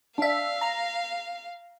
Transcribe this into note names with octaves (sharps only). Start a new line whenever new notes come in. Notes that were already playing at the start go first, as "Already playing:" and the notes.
D4 E5 F5
A#5